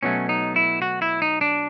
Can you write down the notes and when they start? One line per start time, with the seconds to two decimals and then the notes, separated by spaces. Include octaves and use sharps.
0.03 B2 F#3 A3 C#4
0.29 D#4
0.56 E4
0.82 F#4
1.02 E4
1.22 D#4
1.41 D4